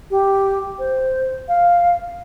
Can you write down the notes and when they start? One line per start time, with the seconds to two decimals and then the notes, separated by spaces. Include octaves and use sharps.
0.11 G4
0.79 C5
1.48 F5